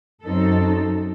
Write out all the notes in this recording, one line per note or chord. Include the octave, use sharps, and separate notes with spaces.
F#2 F#3 C4 D#4 A4